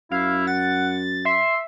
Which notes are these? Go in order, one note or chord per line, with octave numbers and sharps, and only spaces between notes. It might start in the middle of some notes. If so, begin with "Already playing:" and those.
F#2 E4 F5
F#5 A6
E5 C6